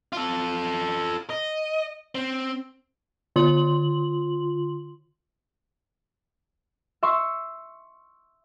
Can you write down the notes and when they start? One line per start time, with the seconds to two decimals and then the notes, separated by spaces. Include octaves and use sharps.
0.13 F4 A4
1.30 D#5
2.15 C4
3.36 D3 F4 C6 F#7
7.03 E5 C6 C#6